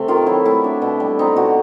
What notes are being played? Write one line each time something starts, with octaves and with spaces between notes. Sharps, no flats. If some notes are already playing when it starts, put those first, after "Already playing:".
Already playing: C3 A3
D#3 F4
F#3 E4
A3 E4
D4
B2
G3
C4 D#4
B2 F#4